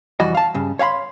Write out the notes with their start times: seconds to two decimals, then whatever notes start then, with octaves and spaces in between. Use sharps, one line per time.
0.20 C2 F2 E3 G3 F#4 D#5
0.35 F5 A5
0.54 G2 C#3
0.79 C#5 F5 F#5 B5 C6